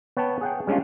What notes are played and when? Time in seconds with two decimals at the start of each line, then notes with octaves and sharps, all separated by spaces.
0.17 B3 C#5 G5 A5
0.41 G#4 F#5 G5
0.67 G3 G#3 C#4 D4 F4